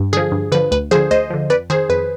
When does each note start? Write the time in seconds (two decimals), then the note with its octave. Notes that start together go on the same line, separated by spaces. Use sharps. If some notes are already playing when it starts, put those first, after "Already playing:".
Already playing: G2
0.13 D3 G#4
0.17 F3
0.32 G2
0.52 D3 F3 B4
0.71 D2 B4
0.91 F3 G#4 C5
0.95 D3
1.11 D2 C5 D#5
1.30 D3 F3
1.50 F2 B4 D5
1.70 D#3 G#4 C5
1.89 F2 B4